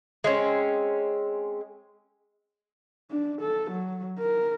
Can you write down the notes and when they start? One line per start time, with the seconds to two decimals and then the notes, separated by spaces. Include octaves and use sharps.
0.24 G#3 C4 C#4
3.11 D4
3.41 A4
3.70 F#3
4.19 A#4